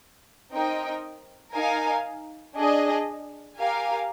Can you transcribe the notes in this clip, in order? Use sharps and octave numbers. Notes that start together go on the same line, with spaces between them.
C4 D#4 A#4 D#5 G5
D#4 A#4 F5 G#5
D4 G#4 D#5
G4 A#4 F5 G#5